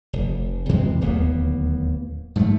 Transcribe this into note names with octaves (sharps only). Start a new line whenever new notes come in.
F1
E2 C3 E3 G#3
D1 D#2 A#3 B3
G#2 F3 G3 A3